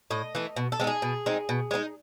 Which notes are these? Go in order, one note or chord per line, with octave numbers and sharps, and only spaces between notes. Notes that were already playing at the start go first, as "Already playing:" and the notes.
A2 D#5
E3 A3
B2
A4
G#3 C4 D#4 G#4
B2
G#3 C4 D#4
B2
G#3 C4 D#4